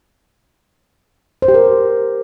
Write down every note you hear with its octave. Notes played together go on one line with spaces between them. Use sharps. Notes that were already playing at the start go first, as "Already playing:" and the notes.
C5
G4
A#4